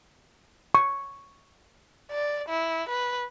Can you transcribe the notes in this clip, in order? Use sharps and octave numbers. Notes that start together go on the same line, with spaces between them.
C#6
D5
E4
B4